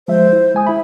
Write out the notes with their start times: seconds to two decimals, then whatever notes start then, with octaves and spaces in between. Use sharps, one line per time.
0.08 F3 G#3 C5 E5
0.33 E4
0.55 G#3 G#5 D#6
0.67 E4 E5 B5